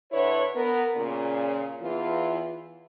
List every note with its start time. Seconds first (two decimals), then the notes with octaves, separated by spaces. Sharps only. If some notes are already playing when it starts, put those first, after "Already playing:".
0.12 D3 E4 B4 C#5
0.54 B3 A#4
0.95 A#2 C#3
1.82 E2 E3 F4